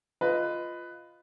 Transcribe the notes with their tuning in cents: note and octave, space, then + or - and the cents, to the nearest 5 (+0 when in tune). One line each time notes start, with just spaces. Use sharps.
F4 +0 B4 +15 D#5 +0